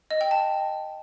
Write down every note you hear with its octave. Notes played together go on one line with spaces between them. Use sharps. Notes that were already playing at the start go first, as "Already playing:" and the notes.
D#5
G5
A5